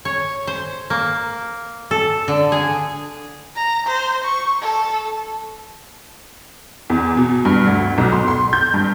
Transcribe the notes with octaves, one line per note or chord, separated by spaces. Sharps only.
C#5
C5
A#3
A4
D3
G#4
A#5
C5
C#6
A4
E2
B2
G2
D2
B1
C6
C6
G6
G2